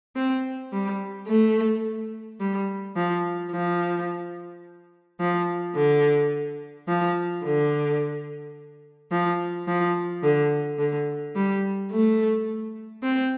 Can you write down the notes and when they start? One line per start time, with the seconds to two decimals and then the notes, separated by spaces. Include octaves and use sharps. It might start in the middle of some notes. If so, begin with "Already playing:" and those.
0.16 C4
0.73 G3
1.28 A3
2.40 G3
2.96 F3
3.52 F3
5.20 F3
5.75 D3
6.88 F3
7.44 D3
9.11 F3
9.67 F3
10.23 D3
10.79 D3
11.35 G3
11.91 A3
13.03 C4